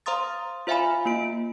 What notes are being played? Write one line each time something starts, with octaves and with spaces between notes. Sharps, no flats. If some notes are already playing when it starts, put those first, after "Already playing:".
C5 F5 A#5 C6 D#6 A6
F4 C5 E5 F5 G#5 B5
A#3 F4 D7